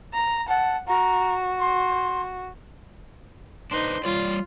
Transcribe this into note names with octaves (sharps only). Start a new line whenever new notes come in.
A#5
F#5 A5
F#4 A#5
C6
D4 D#4 B4 C5 C6
G3 F4 C#5 D5